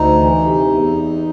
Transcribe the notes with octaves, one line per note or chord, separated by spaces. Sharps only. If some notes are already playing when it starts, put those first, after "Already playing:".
Already playing: D2 D#4
E3
C3
E2